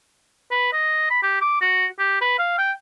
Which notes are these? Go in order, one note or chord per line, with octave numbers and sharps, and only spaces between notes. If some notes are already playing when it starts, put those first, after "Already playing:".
B4
D#5
B5
G4
D6
F#4
G4
B4
F5
G5